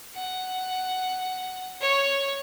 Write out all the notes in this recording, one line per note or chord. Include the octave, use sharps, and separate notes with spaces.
F#5
C#5